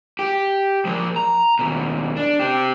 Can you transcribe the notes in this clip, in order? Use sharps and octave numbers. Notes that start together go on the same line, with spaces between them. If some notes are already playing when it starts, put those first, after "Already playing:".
G4
F3 A#3
A#5
D#2 B2
D4
C4 G4